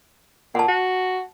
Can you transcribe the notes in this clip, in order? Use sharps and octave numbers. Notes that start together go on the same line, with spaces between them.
A#2 F#5 A5
F#4